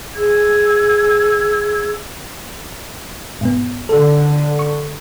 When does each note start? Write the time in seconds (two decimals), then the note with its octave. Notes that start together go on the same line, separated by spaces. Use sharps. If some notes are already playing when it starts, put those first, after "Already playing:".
0.15 G#4 E6 G#6
3.41 G#2 B2 B3
3.89 D3 A4
4.59 C#6